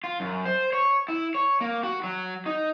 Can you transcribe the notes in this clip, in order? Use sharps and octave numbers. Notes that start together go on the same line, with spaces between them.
F4
F#2
C5
C#5
E4
C#5
A#3
F#4
F#3
D#4